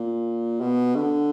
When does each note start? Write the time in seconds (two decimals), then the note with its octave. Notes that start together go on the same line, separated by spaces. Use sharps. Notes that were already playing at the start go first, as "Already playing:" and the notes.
Already playing: A#2
0.61 B2
0.96 D3